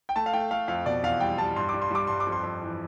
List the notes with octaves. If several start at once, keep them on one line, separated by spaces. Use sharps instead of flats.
G5
A3 A5
F5
A3 G5
A3 F5
F2 F5
B2 D5
E2 F5
G3 G5
G3 A5
G2 C6
G3 D6
C6
G3 D6
G2 C6
D6
F2
C6
F2
E3